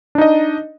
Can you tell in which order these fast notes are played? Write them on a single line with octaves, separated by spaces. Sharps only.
D4 D#4 D#5